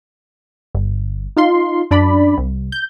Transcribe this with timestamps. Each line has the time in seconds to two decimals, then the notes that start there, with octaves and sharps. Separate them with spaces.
0.75 G1
1.37 D#4 F4 C6
1.91 F#2 D4 D5 B5
2.38 C2
2.72 G6